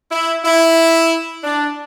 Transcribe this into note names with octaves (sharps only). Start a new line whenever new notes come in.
E4
E4
D4